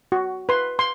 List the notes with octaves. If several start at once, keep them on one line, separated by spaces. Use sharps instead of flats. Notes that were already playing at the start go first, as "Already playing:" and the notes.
F#4
B4 C6
C6